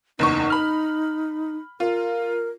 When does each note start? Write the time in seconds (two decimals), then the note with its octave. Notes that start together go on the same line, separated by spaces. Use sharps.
0.19 F#1 E2 D#4 C#6
0.50 B5 F6
1.80 F4 A#4